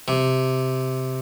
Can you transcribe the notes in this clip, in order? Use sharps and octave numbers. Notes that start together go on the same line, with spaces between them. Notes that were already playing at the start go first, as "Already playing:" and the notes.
C3